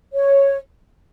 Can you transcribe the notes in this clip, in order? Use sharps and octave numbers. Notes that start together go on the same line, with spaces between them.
C#5